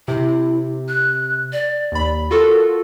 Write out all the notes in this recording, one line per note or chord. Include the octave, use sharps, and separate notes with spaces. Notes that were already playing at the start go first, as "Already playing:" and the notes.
C3 E4
F#6
D5
D#2 B5
F4 F#4 A4 A#4